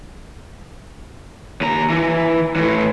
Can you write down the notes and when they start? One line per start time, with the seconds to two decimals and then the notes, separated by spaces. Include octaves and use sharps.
1.61 D#2 A#5
1.90 E3
2.56 A2 E3